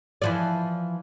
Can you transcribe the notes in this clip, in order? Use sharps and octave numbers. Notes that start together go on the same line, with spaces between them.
E3 F3 D5